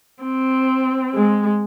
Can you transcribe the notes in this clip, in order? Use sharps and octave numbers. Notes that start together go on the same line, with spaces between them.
C4
G#3